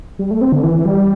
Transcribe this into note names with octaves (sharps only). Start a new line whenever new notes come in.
G3
A3
C4
D3
E3
G3